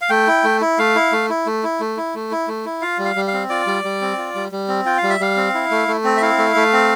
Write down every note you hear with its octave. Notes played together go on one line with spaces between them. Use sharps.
F5
A3 G5
E4
A3
E4
A3 F5
E4
A3
E4
A3
E4
A3
E4
A3
E4
A3
E4
F4 F5
G3
F5
G3
F5
C4
F4 D5
G3
G3
C4
F4
G3
G3
C4
F4 G5
F5
G3
E5
G3 F5
C4
E4
A3
A3
C4
E5
E4 F5
A3
A3
C4